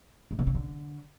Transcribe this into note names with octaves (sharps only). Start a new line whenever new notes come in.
A2
B2
C#3
D3